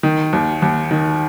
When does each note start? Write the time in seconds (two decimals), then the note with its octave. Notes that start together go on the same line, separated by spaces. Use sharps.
0.03 D#3
0.33 D#2
0.62 D#2
0.91 D#3